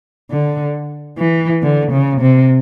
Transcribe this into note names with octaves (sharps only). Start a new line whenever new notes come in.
D3
E3
D3
C#3
C3